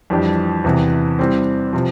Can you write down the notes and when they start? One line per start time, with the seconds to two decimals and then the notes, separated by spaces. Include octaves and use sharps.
0.10 F2 E3 G3 D4 G4
0.64 E2 C3 E3
1.19 E3 G3 C4
1.73 C3 F3